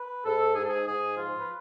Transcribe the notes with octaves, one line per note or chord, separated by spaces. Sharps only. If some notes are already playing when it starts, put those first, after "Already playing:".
Already playing: B4
G#2 A4
G#2 G#4
A4
G#4
G#2 G#4
F3 F4
B4